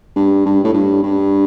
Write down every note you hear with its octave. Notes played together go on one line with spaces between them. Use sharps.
G2
G2
A2
G2
G2